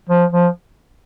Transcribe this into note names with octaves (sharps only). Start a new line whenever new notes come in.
F3
F3